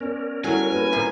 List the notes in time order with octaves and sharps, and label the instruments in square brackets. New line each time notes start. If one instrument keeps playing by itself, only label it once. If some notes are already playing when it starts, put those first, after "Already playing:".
[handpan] B3 D5 [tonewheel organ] C#4 A#4
[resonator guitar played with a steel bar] F#3 [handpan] G3 E4 A4 [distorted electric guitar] G#5
[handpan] A#3 B4
[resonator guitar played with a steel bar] F#2 [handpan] A#2 C4